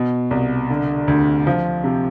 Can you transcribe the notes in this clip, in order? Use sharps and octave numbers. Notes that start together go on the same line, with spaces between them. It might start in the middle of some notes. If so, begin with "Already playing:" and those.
Already playing: B2
C2
D3
D2
F3
C3